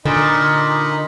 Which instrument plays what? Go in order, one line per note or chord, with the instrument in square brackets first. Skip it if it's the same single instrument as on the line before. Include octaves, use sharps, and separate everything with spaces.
[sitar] A#2 [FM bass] D3 [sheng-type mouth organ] D#4 D#5 B5